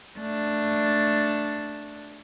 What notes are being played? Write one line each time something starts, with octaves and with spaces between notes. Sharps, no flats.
A3 D4